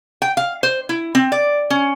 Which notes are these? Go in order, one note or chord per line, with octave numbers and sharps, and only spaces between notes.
G5
F5
C5
E4
C4
D5
C#4